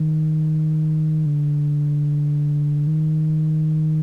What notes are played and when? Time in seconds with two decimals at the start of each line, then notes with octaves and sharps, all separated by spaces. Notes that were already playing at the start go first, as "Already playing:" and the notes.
Already playing: D#3
1.26 D3
2.87 D#3